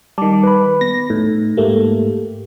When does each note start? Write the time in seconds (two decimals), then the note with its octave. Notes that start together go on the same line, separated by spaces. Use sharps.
0.18 D#3 G3 A5 D6
0.43 B4 B5
0.81 B3 A#6
1.10 A2 D#4
1.57 G#2 A3 A#3 G4